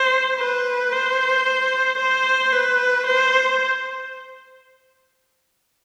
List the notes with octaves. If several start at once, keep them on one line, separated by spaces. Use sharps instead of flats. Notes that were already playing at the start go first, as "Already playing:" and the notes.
Already playing: C5
B4
C5
C5
B4
C5